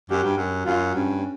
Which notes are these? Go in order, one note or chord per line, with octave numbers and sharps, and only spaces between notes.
F#2 G4
G2
F#2
F#2 F4
G2 C#4